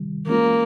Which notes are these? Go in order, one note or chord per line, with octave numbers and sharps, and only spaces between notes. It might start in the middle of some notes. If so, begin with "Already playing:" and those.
Already playing: C3 D#3 G3
E3 G#3 A#3 C#4 F4